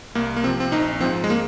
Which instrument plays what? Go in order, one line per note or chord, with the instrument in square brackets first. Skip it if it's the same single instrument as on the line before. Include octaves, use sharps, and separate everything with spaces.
[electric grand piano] C2 A#3
A#3
C3 F3 C4
C4
A#1 D#4
G#2 F3 C4
G#3
A#3